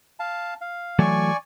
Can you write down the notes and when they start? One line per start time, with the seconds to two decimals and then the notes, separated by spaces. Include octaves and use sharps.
0.20 F5 A5
0.61 F5
0.99 E3 F#3 A3 D5 G#5 C#6